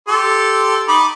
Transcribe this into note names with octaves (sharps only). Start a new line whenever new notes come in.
G4 A4 C6
D#4 B5 D6